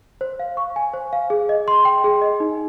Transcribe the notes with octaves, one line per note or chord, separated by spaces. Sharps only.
C5
F5
C#6
G#5
C5
F5
G#4
D#5
C6
G5
G#4
D#5
D#4